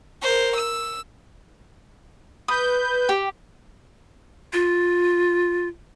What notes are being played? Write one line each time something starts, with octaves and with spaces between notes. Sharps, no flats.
A#4 C5
E6
B4 D#6 G6
G4 G5
F4